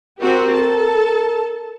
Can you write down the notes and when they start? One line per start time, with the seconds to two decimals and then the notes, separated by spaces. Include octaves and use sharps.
0.21 C4 F#4 G4 A#4
0.54 A4 A5